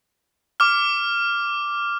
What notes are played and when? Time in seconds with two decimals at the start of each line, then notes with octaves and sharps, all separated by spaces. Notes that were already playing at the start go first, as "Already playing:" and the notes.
0.60 D6 F6